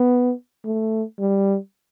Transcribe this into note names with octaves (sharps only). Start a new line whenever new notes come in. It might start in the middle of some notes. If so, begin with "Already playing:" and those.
Already playing: B3
A3
G3